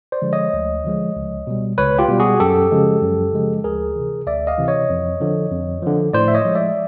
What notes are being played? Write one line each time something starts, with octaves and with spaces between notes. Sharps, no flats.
C5 D5
D3 F3 G#3
C#5 D#5
D2
D3 F3 G#3
C#2
B2 G3
C#2 B4 C#5
F4 G4
B2 G3
F#4 G#4
F#2 G4 A4
C#3 F3 G#3
F#2
C#3 F3 G#3
D2 G#4 A#4
C3 E3
D2 D5 E5
D#5 F5
C3 E3
C#5 D#5
F2
D3 F3
F2
D3 F3
A2 C5 D5
E5
C#5 D#5
F3 G#3
D5 E5